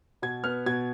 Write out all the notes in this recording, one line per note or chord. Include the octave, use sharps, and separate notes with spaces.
B2 G#6
B3 F6
B2 G#6